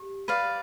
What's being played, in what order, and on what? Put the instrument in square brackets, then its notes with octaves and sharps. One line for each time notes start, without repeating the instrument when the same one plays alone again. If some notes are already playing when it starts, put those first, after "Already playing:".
Already playing: [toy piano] G4
[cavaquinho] B4 D5 F5